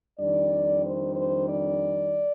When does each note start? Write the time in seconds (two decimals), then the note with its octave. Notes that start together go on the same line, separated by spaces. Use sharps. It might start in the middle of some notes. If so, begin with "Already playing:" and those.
0.19 F2 D#3 G3 D4 D5
0.84 C5
1.16 C5
1.49 D5